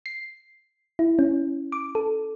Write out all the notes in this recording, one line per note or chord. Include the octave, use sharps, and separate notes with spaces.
C7
E4
C#4
D6
A4